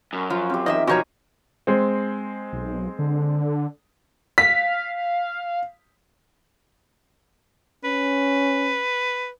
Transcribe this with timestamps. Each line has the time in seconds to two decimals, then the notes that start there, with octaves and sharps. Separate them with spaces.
0.13 F#2
0.30 F3 F4
0.49 C4 G4
0.66 E2 D#3 F4 D#5 E5
0.87 B2 F3 F#3 F#4 C#5 G#5 A#5
1.67 G#3 C4
2.53 B1
2.99 D3
4.38 F5 B6
7.84 C#4 B4